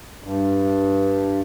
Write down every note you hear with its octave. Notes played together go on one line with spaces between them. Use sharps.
G2